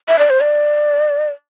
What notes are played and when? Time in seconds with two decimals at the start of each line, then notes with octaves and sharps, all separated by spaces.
0.08 E5
0.19 D5
0.30 C5
0.41 D5